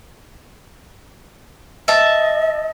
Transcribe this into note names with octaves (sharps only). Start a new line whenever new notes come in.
D#5 E5 A5